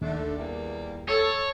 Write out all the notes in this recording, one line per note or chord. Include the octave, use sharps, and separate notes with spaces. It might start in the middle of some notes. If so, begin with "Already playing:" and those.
D#2 D3 A3 D4
E2 G3 A#3
A4 C#5